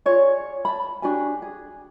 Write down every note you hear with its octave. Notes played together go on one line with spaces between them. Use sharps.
F4 G#4 C#5 D5
A5 B5
D4 F#4 G4 G#5
G#4